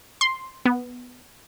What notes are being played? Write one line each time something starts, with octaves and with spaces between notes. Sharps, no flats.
C6
B3